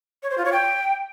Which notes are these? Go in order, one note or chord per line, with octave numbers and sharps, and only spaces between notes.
C#5
C5
F4
C#5
G5